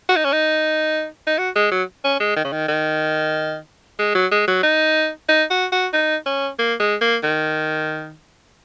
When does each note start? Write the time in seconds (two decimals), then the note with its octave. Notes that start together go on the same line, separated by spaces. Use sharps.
0.09 F#4
0.17 D#4
0.25 C#4
0.33 D#4
1.27 D#4
1.38 F#4
1.55 G#3
1.71 F#3
2.04 C#4
2.20 G#3
2.36 D#3
2.45 C#3
2.52 D#3
2.68 D#3
3.99 G#3
4.15 F#3
4.31 G#3
4.48 F#3
4.63 D#4
5.29 D#4
5.51 F#4
5.72 F#4
5.93 D#4
6.26 C#4
6.59 A#3
6.80 G#3
7.01 A#3
7.23 D#3